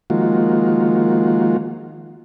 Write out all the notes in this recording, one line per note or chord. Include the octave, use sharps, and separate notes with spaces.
D#3 F3 G#3 A#3 F4 F#4